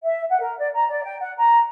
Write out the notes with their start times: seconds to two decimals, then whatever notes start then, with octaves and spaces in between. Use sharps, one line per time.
0.04 E5
0.29 F#5
0.40 A#4
0.57 D5
0.75 A#5
0.88 D5
1.03 G5
1.20 F#5
1.37 A#5